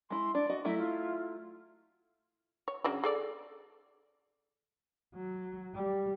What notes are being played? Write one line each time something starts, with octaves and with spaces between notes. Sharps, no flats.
G#3 E4 C6
D4 D5
F#4 D#5
F#3 A3 E4 E5
F4
C#5
C#3 F#3 D4
G#4 A4 D5
F#3
G3